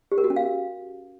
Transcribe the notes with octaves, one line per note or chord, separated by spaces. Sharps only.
G4
A#4
F#4
C#4
F5